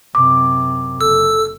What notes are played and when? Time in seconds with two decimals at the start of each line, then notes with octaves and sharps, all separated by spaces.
0.15 F#2 C3 D6
1.01 F#1 A4 E6